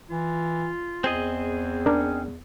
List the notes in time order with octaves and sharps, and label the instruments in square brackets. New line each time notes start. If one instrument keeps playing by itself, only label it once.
[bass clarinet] E3 [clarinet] F4
[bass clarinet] E2 [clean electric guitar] C4 G#4 D#5
[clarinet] C#4 [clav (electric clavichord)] D4 A#4